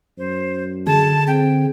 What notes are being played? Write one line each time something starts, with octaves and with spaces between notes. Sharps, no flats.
F#2 C5
D3 G#4 A5
C4 G5